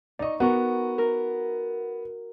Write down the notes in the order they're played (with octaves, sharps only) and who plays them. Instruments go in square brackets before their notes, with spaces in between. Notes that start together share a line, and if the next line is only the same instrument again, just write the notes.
[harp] D#4 C#6 [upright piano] D5 D#5
[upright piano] B3 [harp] F#4 A#4 C#6
[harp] A#4